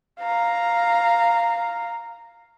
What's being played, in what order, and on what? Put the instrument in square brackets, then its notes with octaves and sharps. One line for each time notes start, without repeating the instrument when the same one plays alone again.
[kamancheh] F5 A#5